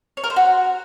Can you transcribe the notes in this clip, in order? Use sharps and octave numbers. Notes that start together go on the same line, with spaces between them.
C#5
A#4
C5
F#4